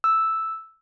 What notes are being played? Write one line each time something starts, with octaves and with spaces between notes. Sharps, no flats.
E6